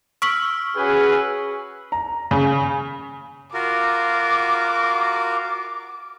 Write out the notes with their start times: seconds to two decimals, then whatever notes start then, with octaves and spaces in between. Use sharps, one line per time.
0.22 C#6 E6 F6 B6 D7 F#7
0.76 C#4 F#4 G#4 B4
1.92 A#5
2.31 C#3
3.54 F4 F#4 A#4 D6